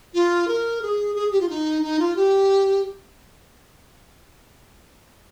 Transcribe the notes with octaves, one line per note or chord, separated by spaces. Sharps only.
F4
A#4
G#4
G#4
G4
F4
D#4
D#4
F4
G4